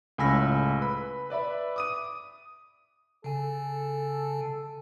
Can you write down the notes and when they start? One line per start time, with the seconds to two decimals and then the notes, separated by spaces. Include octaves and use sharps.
0.18 C#2 A2 G#5 B5 E6 A#6
0.81 B4 B5
1.30 B4 D5 E5 B5
1.76 D6 D#6 D#7
3.24 C#3 A4 G#5